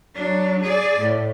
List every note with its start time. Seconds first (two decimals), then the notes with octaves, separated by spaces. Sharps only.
0.14 F#3 D4
0.63 G#4 D5
1.00 A2